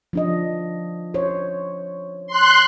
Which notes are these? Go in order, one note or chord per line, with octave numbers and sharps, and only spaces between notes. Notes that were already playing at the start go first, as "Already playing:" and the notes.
F3 D4 D#5
C5 C#5
C6 F#6